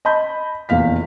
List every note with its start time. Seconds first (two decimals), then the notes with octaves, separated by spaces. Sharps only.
0.05 D#5 A5 B5 G6
0.69 F1 E2 A#2 F5 B6